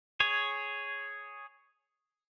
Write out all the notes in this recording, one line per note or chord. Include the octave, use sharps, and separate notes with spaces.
G#4 C#5